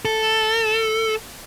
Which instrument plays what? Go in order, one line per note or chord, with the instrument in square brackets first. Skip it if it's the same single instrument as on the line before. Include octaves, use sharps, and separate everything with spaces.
[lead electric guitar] A4